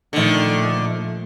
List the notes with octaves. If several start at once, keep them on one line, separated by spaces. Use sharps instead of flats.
A#2 D3 D#3 F3 A3